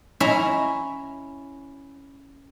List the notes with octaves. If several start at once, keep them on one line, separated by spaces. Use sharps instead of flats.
C#4 E4 E5 A#5